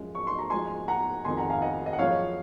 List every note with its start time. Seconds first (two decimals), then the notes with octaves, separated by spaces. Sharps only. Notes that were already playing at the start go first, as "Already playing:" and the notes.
Already playing: F#2 F3 G#3
0.15 C#6
0.27 C6
0.39 A#5
0.50 G#2 F3 G#3 G#5 C6
0.88 F#5 A#5
1.25 F2 D#3 G#3 G#5 C6
1.37 F#5 A#5
1.50 F5 G#5
1.62 D#5 F#5
1.86 D#5
1.93 F#5
1.98 F#2 F3 G#3 C#5 F5